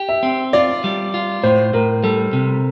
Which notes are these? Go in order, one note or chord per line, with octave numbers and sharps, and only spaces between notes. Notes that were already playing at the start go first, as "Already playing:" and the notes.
Already playing: G4
E5
C4
F4 D5
G3
F4
A2 C5
A2 A#4
G3 A4
C3